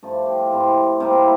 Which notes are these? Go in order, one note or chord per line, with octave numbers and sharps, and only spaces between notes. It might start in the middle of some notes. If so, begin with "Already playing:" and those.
G2 F3 A3 D4
G4
F4
G2 F3 C4 E4
C3 G3 A#3 F4
E4